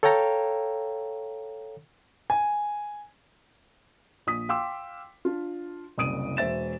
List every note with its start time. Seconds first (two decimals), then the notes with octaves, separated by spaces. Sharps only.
0.03 A4 C#5 F5 G5 A#5
2.30 G#5
4.27 A#1 D#6 B6
4.49 F5 G5 C6 D6 E6
5.25 D4 F4
5.98 F#1 C2 D#6 D7 D#7
6.37 E1 C5 E5 A6 E7